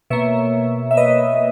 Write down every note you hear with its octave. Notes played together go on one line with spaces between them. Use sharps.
B2 A#3 C#5 E5
E5
B4 D#5